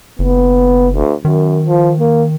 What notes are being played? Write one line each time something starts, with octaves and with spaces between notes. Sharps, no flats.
F#1 B3
D2
F#2 D#3
F3
A#3